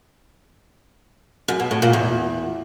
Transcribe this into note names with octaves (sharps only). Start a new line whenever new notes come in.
F#2
B2
A2
A#2
E2